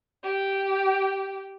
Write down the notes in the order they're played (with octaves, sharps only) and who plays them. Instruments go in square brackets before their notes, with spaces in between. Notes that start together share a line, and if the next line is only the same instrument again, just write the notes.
[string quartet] G4